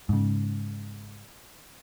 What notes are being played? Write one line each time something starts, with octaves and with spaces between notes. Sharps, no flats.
G#2 C#3